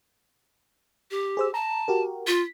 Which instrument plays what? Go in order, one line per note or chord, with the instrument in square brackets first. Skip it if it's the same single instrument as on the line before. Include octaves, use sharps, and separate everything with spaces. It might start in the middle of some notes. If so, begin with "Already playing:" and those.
[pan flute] G4
[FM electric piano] G#4 C5 E6
[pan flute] A5 [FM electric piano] A#5
[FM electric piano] F#4 G4 A#4
[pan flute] F4 [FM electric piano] B6